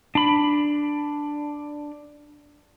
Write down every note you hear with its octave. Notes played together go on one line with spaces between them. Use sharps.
D4 B5